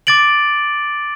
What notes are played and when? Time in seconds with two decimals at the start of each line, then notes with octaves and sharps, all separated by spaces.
0.07 D6 A6 D7 F#7